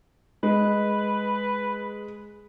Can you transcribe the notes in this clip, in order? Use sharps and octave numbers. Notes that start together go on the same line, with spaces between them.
G#3 B4